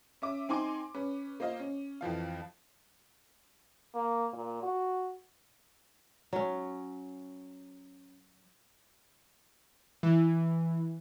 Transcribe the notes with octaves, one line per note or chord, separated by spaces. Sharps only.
C#4 E5 D6
C4 D#4 G#5 C6 D6
C#4 B4
A#3 F4 C5 D#5 F5
C#4
F2 E3 F3 F5
A#3
A#2
F#4
F#3 C#4
E3